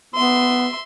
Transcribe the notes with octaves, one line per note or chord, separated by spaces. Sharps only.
B3 E5 C6